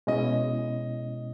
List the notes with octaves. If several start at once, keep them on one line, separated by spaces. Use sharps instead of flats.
B2 G#3 C#4 E4 D#5